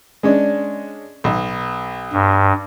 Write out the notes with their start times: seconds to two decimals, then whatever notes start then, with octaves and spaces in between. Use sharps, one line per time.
0.23 G#3 C#4 D4
1.24 B1
2.13 G2